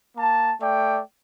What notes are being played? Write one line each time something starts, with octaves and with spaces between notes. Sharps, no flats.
A#3 A5
A3 D5 G5